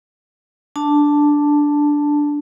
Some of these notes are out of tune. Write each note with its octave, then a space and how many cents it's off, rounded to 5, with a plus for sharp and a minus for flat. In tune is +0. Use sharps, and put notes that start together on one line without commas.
D4 +0 A5 +0